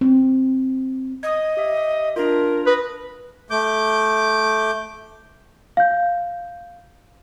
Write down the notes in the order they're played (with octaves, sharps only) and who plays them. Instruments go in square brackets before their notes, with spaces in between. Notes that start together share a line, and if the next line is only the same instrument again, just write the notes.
[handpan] C4
[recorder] D#5 [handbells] D#6 G#6
[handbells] G4 E5
[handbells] D4 F4 [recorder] A#4
[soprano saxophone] B4 [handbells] D#6 A#6
[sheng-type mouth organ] A3 D6 G6
[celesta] F5 G6